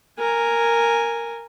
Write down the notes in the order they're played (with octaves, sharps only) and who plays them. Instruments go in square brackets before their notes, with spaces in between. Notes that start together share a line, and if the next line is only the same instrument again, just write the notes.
[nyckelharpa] A#4 G#5